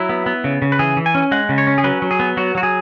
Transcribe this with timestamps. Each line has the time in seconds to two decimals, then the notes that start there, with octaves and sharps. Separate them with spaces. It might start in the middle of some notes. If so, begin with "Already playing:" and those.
Already playing: F#3 E4
0.09 B3
0.26 B3
0.44 C#3
0.62 C#3
0.72 B4
0.79 E3 G#4
0.97 E3
1.06 G#5
1.15 C#4
1.31 G#3 F#5
1.49 C#3
1.58 C#5
1.67 C#4
1.78 G#4
1.84 F#3 B4
2.02 F#3
2.11 G#4
2.20 B3
2.37 F#3 F#4
2.55 F#3 F#4
2.63 G#4